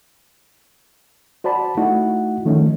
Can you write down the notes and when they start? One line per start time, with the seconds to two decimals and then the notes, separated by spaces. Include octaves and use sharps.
1.44 F#4 C5 D5 A5 B5
1.77 A3 D#4 E4 F#4 F#5
2.45 D#3 F3 A3 C#4 D#4